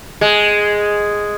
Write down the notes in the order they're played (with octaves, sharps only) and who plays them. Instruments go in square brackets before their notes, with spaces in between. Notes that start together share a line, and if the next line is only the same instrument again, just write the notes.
[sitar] G#3